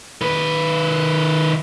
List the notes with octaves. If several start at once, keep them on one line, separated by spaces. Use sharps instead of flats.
D#3 B4